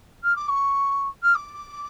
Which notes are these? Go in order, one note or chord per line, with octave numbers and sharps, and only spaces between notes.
F6
D6
C#6
F6
D6